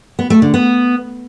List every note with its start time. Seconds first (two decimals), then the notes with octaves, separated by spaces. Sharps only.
0.19 B3
0.30 A3
0.42 D3
0.54 B3